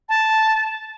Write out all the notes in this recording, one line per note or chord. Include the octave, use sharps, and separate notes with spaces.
A5